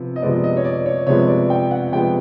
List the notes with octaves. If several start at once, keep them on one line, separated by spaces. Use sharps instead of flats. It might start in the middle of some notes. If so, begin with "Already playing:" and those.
Already playing: C3 F3 B3
D#5
C3 F3 G#3 B3 D5
D#5
C#5
D5
C#5
C3 F3 G#3 B3 C#5
D5
G5
F#5
C3 F3 G#3 B3 G5